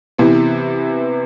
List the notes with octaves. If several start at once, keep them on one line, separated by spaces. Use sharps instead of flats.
C3 E3 B3 E4